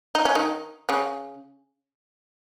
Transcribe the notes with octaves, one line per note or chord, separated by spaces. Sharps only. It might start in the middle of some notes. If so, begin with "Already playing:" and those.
D#4
C#4
D#3 D#4
C#3 C#4